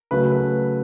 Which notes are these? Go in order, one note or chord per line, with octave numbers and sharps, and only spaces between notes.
C#3 F#3 A3 B4
B4